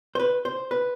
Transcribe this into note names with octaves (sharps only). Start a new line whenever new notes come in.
C5
B4
C5
B4